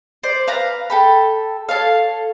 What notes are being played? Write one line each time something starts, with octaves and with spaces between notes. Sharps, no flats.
C5 D5
B4 F5 A#5
A4 G5 B5
A4 C#5 F5